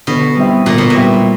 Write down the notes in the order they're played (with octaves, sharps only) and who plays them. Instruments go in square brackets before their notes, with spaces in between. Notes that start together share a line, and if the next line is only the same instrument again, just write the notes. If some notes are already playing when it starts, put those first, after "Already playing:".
[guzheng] B2 [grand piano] D3
[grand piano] G3 C4 E4
[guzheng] A#2 [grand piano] D3
[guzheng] B2
A#2
[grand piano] G3 C4 E4